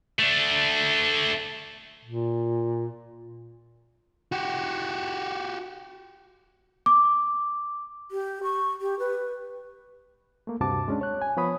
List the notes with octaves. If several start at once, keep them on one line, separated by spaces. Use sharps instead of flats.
A3 D4
A#2
F#4 G4
D6
G4
C#6
G4
B4
A3 A#3
D2 G2 C3 F#4 A5 D6
G#3 C#4 D4
C#5 F#6
G#5
F3 B3 C#5 B5 D#6